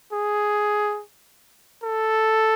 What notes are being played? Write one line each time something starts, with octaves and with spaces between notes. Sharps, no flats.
G#4
A4